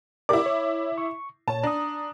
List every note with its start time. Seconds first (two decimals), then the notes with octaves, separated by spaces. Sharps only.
0.29 E4 G4 A#4 D5 D6
0.46 C#5
0.98 C#6
1.48 A#2 C#5 A5
1.63 D4 A#5 D#6